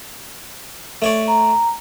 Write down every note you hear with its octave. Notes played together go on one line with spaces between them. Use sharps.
A3 C#5 D5
A#5